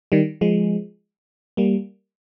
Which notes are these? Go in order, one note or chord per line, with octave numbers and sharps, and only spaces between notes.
D#3 G3
F3 G#3
G3 A#3